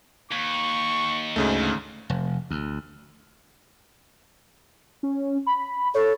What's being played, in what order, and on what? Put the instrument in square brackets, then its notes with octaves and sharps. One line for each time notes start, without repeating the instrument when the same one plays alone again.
[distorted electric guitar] D#2 [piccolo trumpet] C#6
[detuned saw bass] D2 [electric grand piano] G#2 C#3 A3
[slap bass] F1
D2
[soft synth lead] C#4
B5
[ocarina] A4 [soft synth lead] C#5